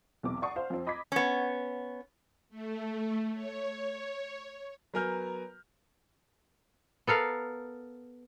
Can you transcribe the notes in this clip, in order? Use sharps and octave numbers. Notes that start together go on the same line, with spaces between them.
B1 E2 C3 D6
D5 F#5 A5 C#6 D#6 C7
C5 F5 F#5
F2 C4
D#5 B5 D6 G#6 B6
B3 C#4
A3
C#5
F#3 B3 A#4 G#5 F6 G6
B3 A4 A#4 F5